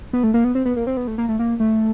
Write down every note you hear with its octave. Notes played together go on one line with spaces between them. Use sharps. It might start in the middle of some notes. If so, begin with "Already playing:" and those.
B3
A3
A#3
B3
C4
B3
A#3
C4
B3
A3
A#3
A3
A#3
A3